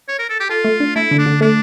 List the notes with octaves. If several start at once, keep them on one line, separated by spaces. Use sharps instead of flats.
C#5
A#4
A4
G4
F4 A4
A3
D4
A3 E4
D3
D4
D3
A3 D4